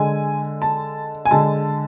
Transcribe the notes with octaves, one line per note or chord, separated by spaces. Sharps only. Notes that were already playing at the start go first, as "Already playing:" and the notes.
Already playing: D3 G#3 G#5
A5
G#5
D3 G#3 A5